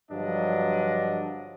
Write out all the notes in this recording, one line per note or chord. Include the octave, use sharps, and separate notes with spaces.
G2 D3 F3 F#3 D4 D#5